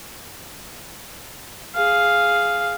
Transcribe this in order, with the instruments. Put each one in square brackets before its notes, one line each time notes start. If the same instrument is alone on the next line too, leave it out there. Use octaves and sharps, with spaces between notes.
[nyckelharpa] G#4 F5